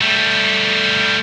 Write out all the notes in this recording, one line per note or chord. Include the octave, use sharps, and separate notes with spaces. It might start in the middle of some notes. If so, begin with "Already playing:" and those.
G3 A3